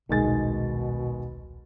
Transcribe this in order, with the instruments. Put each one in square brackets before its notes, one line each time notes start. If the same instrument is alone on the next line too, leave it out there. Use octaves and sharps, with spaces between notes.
[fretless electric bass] D#1 B1 D3 [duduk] B2 [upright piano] D#3 G#3 A6